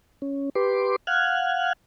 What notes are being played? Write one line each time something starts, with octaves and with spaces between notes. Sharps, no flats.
C#4
G4 B4 C6 D6
F5 F#5 F6 F#6 G#6